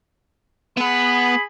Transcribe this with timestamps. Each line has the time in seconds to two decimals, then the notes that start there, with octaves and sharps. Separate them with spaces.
0.77 B3 G#4 F#5 B5